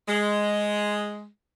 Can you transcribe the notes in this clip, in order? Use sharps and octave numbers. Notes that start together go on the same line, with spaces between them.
G#3